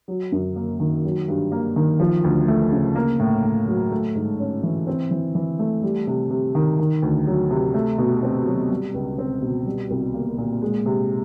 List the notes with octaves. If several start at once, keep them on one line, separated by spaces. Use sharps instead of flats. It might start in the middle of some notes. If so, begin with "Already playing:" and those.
F#3
F#2
A#3
D#3
F#3
G2
A#3
D#3
F3
D2
A3
C#3
A#3
A2
A2
F#3
A3
G#2
C#4
E3
C4
E3
E3
A3
G3
C3
C3
D#3
D#3
D2
F#3
C3
A3
B2
C4
F#3
G3
C#2
C4
B2
G3
C2
A#3
A#2
G#3
C3